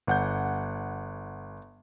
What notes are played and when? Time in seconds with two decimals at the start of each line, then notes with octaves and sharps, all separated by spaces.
0.07 G1 F#5 G6